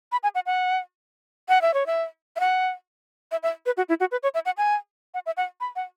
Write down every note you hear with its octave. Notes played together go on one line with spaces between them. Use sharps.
B5
G#5
F#5
F#5
F#5
E5
C#5
E5
E5
F#5
E5
E5
B4
F#4
E4
F#4
B4
C#5
E5
F#5
G#5
F#5
E5
F#5
B5
F#5